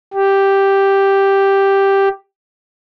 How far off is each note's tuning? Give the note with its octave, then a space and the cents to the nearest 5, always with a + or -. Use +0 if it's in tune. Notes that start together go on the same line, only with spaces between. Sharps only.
G4 +0